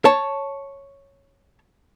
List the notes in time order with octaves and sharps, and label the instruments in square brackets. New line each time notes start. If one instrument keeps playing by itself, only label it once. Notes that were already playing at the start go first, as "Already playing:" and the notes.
[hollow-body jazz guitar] C#5 A5